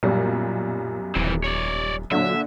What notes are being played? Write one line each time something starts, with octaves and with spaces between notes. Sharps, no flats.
B1 F#2 A#2 G3
D#1 E3 C4
C#5 D5
A#2 D3 F#3 E5